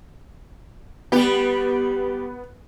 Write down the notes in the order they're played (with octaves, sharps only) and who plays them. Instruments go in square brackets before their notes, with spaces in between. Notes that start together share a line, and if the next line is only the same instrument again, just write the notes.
[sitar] G3 G4 [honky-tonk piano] B3